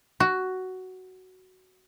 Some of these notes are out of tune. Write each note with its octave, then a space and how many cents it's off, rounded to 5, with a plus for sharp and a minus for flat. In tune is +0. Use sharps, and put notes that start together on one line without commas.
F#4 +10